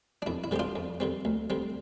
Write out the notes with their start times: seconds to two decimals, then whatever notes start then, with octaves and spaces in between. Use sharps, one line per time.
0.22 D4
0.26 F2 E4
0.44 E4
0.51 D3 G3 C4 G4
0.59 D4 F4
0.76 F2
1.00 D3 G3 C4
1.25 D2
1.50 D3 G3 C4